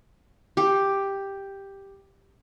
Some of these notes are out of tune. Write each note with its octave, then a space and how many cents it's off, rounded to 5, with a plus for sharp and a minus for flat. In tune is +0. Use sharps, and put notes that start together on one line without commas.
G4 +5